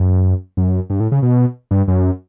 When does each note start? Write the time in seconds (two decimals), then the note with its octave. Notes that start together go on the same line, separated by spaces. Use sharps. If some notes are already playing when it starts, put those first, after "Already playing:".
Already playing: F#2
0.57 F#2
0.90 G2
1.00 A2
1.12 C#3
1.22 B2
1.71 G2
1.88 F#2